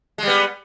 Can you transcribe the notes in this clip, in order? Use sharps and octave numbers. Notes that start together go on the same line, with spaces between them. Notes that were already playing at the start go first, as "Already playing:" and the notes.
G3 G#3 B3